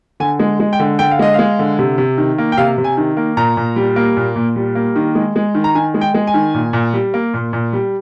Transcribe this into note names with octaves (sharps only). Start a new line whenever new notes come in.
D3 G#5
G#3
G#3
G5
D3
D3 G5
F5
G#3 D#5
G#3 F5
D3
C3
C3
D#3
A#3
G5
C3 F5
C3
G#5
D#3
A#3
A#2 A#5
A#2
G3
A#3
A#2
A#2
G3
A#3
D#3
G#3
G#3
D#3
A#5
D#3 G#5
G#3
G5
G#3
G#5
D#3
A#2
A#2
G3
A#3
A#2
A#2
G3